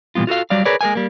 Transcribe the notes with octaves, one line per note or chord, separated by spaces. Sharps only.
A#2 E3 G3 B3 F4
F4 F#4 A4 F5
F#3 G3 D5 F5
G#4 A#4 B4 C#5 D5
G#3 A#3 A#4 F5 G#5
G3 A#3